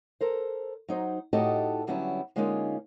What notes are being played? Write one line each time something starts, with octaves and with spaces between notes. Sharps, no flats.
A4 A#4 C5
F#3 D#4 C5
A2 D#4 F#4 G4 A4 D#5
D3 F#3 G3 B3 C#4 E4
D3 G#3 A#3 C#4 D#4 F4